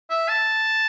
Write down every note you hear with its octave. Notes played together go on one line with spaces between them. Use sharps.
E5
A5